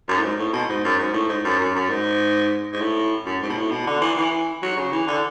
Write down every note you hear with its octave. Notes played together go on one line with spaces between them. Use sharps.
F#2
A2
G#2
A2
B2
G#2
F#2
G#2
A2
G#2
F#2
F#2
F#2
G#2
G#2
A2
F#2
G#2
B2
A2
B2
D3
E3
E3
F#3
C#3
E3
D3